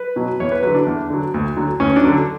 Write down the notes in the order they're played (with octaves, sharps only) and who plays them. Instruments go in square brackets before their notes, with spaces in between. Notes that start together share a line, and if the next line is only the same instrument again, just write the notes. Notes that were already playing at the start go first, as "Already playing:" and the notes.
Already playing: [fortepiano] B4
B2 F#3
E2 C#5
B4
D3 F#3 B4
D4
E2
D3 F#3
D2
D3 F#3
D2 C#4
D4
D3 F#3